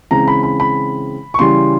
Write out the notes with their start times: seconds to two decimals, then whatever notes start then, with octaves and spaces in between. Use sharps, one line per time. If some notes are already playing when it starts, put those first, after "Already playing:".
0.11 C#3 E3 G#3 C4 A#5
0.28 B5
0.43 B5
0.60 B5
1.34 C#6
1.39 C#3 E3 G3 C6